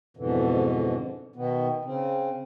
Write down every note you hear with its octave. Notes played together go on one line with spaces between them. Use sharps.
F2 G#2 B2 D3 E3
B2 D#3 B3
C#3 C4